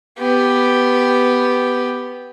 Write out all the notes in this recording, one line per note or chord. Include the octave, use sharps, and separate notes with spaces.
B3 G4